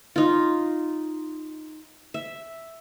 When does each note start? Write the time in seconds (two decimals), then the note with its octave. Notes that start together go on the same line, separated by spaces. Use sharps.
0.16 D#4 F4
2.14 E5